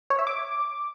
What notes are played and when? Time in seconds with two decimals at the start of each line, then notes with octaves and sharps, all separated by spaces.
0.10 C#5
0.19 E5
0.27 D6